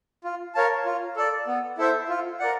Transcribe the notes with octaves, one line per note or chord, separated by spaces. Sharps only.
F4
A#4 C#5 F5 A5
F4
A4 D5
B3
E4 A4 C5 E5
F4
A#4 D5 F#5